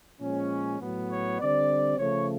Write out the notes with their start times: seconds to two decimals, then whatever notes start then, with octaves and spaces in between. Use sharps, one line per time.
0.20 A#2 F3 G#3 C#4
0.80 A2 F#3 B3
1.10 C#5
1.40 D3 G3 C4 D5
1.99 C#3 F3 A3 C#5